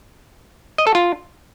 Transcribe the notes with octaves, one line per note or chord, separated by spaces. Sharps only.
D#5
A4
F4